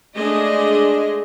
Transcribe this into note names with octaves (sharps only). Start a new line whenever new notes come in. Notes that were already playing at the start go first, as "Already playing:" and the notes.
G#3 A3 D4 G#4 D#5